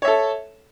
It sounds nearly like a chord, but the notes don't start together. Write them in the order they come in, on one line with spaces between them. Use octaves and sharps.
C#5 E5 A4